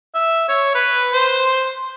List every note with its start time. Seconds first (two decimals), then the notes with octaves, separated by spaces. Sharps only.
0.15 E5
0.48 C#5
0.75 B4
1.13 C5